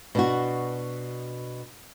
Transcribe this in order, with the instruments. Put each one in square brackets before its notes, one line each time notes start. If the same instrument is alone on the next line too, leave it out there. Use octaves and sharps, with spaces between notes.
[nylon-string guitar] B2 D4 F#4